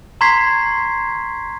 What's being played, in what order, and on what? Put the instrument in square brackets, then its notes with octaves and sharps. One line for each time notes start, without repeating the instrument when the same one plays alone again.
[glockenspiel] A#5 C6 C#6 G#6 B6 C7